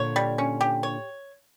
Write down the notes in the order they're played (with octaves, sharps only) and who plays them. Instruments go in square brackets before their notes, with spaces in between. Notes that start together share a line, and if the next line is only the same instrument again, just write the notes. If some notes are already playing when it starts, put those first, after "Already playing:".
Already playing: [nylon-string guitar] A#2 D3 [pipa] C#5
[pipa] G3
C#4
G4
C#5